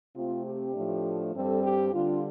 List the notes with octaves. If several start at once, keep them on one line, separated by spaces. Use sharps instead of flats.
C3 A3 C4 F4
G4
A2 F3 A3 D4
G2 G3 C4 A4
G4
D3 G3 D4 F4